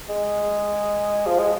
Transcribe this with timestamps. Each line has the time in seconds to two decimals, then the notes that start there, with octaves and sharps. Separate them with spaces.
0.09 G#3
1.27 F3
1.39 G#3